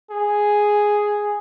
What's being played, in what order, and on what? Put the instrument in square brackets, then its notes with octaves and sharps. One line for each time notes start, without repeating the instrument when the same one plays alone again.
[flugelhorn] G#4